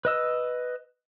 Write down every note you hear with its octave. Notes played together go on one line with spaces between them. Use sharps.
B4 D#5 E6